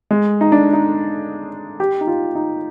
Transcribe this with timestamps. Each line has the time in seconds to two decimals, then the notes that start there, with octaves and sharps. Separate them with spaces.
0.11 G#3
0.41 D#4
0.52 D4
0.73 D#4
1.80 G4
2.01 D#4
2.07 F4
2.35 D#4